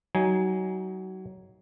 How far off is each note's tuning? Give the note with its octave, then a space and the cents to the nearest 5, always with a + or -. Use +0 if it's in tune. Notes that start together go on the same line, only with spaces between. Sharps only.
F#3 +25 D#4 +25 G#5 +0